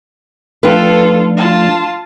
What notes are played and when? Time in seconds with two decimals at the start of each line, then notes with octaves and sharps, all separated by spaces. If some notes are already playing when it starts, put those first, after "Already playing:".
0.63 F3 A3 D4 F4 A4 B4 G5
1.37 F4 A5